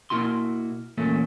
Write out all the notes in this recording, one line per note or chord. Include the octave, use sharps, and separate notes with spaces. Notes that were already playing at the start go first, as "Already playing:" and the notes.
B2 A#3 E4 F#4 C6
E2 A#2 A3 A#3 C#4